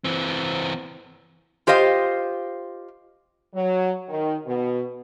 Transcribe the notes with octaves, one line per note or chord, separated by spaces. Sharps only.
E3 C4
F4 G4 C5 D#5 F5
F#3
D#3
B2